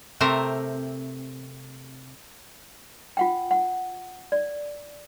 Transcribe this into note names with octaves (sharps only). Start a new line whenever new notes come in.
C3 A3 C4 A#4 C5
F4 F#5 G5
F#5
D5